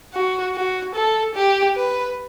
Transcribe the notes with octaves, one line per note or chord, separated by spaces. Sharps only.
F#4
F#4
A4
G4
B4